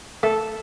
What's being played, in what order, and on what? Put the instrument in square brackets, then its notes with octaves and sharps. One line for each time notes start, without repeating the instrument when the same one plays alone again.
[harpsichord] A3 [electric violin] A4